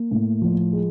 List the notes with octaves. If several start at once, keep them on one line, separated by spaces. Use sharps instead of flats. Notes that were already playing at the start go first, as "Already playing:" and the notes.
Already playing: A#3
A2
F3
G#3